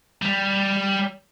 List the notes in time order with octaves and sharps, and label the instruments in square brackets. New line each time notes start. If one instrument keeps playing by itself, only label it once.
[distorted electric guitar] G3